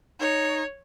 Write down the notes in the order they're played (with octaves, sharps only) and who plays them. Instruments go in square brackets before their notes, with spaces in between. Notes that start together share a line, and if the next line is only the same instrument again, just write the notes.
[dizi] D#4 [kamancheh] C#5